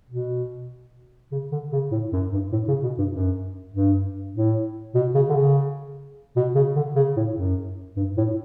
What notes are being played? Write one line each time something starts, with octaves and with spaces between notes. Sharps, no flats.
B2
C#3
D3
C#3
A2
F#2
G2
A2
C#3
B2
G2
F#2
G2
A2
B2
C#3
D3
C#3
B2
C#3
D3
C#3
A2
F#2
G2
A2